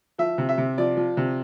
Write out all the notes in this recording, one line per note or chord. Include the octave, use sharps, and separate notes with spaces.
F3 E5
C3
E5
C3
F3 D5
F3
C3